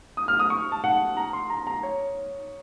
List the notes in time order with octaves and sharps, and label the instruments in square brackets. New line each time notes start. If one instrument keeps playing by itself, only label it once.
[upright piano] D#6
F6
D#6
C#6
A5
F#5
A#5
C6
A#5
A#5
C#5